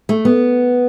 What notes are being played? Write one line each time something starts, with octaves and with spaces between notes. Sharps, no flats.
A3
B3